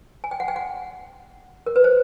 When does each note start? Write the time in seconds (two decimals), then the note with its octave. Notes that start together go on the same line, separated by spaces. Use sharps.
0.24 G#5
0.31 G5
0.40 F#5
0.48 G5
0.56 F#5
1.66 A#4
1.76 B4
1.84 C5